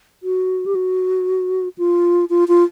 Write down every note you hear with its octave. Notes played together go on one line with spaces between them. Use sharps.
F#4
G4
F#4
F4
F4
F4